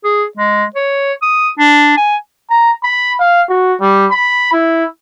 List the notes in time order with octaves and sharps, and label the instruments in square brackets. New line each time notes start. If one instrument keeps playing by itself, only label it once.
[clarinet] G#4
G#3
C#5
D#6
D4
G#5
[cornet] A#5
B5
F5
F#4
G3
B5
E4